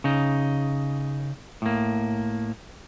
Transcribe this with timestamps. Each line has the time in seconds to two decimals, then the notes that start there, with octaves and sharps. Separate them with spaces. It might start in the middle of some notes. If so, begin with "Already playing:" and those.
0.04 C#3 D#4
1.62 A2 A#3